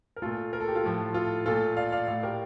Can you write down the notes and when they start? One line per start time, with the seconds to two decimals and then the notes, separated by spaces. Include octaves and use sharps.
0.16 A#4
0.22 A#2 A3 F4 A4
0.53 A#4
0.60 A4
0.68 G4
0.75 F4 A4
0.83 A2 F3 A3
1.14 F4 A4
1.46 A#2 A3 F4 A4
1.77 D5 F5
1.92 D5 F5
2.08 A2 A3 D5 F5
2.23 G4 A#4